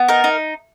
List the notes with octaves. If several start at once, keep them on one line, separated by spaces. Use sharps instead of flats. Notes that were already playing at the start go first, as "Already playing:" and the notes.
Already playing: B3
D#4 A#4
D#4